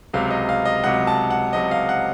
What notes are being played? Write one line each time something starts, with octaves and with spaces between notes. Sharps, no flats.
C#2 C3 F#3 F5
D#5
F5
D#5
C#2 C3 F#3 F#5
A5
F#5
C#2 C3 F#3 D#5
F5
F#5